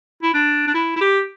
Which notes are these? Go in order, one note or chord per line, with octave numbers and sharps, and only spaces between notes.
E4
D4
D4
E4
E4
G4